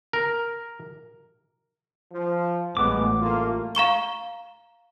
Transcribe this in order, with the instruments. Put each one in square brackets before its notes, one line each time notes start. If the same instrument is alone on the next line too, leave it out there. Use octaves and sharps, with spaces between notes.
[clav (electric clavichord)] A#4
[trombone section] F3
[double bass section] A1 G3 [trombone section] G#3 B3 [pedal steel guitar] D6
[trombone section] A3 A#3 F4
[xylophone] F5 A#5 C#6 G7